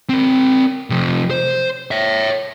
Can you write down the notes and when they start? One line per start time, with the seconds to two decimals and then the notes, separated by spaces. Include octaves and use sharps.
0.09 C4 A#4
0.90 C3 F3
1.30 C5
1.91 C#5 E5